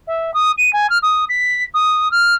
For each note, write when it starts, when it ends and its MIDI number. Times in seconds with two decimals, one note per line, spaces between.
0.07 0.33 76
0.34 0.51 87
0.58 0.72 99
0.73 0.89 80
0.89 0.98 89
1.02 1.24 87
1.29 1.63 95
1.74 2.11 87
2.11 2.34 89